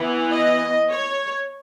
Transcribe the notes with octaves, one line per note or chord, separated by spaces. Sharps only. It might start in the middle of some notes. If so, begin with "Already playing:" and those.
Already playing: E3 B3
D#5
C#5